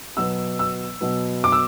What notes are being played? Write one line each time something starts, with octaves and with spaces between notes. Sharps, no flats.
B2 F#3 B3 E6
E6
B2 F#3 B3
D6
E6